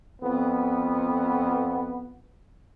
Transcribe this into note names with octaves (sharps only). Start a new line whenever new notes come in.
F2 B3